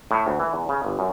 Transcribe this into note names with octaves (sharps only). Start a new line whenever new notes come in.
A2
D2
E3
E2
C#3
G1
F#2